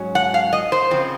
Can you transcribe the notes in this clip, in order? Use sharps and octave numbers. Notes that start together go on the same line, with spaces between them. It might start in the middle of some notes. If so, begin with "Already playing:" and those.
Already playing: G#2 F#3 C#4
F#5
F5
D#5
C5
C#3 F3 C4